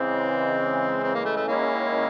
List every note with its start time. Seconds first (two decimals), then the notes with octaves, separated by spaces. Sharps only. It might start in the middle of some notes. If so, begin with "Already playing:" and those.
Already playing: C#3 E3 G#3 C4
1.03 C4
1.14 A#3
1.25 A3
1.36 A3
1.47 D#3 G#3 A#3 C#4 E4